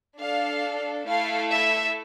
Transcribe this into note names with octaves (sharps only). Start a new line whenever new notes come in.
D4 A4 F5
A3 E4 A4 F5
E5